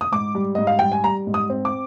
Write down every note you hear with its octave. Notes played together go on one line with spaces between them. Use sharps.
D#6
G#2 D6
G3
G#2 D#5
F5
G3 G5
G#5
G3 A#5
G#2
D#6
C4
D6